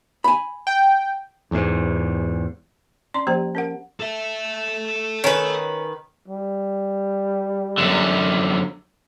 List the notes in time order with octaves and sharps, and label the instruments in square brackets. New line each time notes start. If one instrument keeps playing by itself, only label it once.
[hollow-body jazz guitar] G#5 B5
[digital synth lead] G5
[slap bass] E2 G#2
[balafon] C#4 D5 A#5 C6
F3 A#3 G4 C5 A#5
C#4 A#4 F#5
[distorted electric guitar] A4 E5
[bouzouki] D#3 B4 [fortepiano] C#4
[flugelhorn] G3
[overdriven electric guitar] F#2 D3